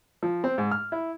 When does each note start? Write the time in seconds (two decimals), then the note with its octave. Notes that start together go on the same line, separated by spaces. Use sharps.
0.23 F3
0.44 C4
0.58 G#2
0.71 F6
0.92 E4